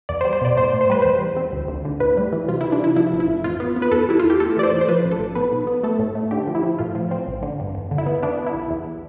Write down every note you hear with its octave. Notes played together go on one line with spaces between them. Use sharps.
E2 D5
C5
G3
C5
B2 D5
A2 C5
A2
C5
G3 B4
E2 C5
E2
C4
D2
D2
D3
A2 B4
G3
E3
C3 F4
E4
E3
D4
C3 E4
F3 E4
A1
E4
A1
F2 F4
B3
B3
B4
E2 A4
G3 E4
E2 F4
G4
A3 A4
E3 D5
C5
A2
C5
F3 B4
A1
A4
A1
B3 B4
B1
B3
A3 A4
A2
A3
D3 G4
F3
E4
F3
A2 F4
F3
C4
A1
D3
G2
E2
D3
E4
B3
B3 D4
B3
E4
B1
E2